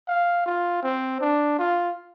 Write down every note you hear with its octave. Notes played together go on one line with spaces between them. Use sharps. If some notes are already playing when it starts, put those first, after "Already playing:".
F5
F4
C4
D4
F4